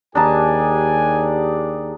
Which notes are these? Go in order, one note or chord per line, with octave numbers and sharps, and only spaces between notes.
D#2 D4 D#4 G4 G#4 D5 G#5 A5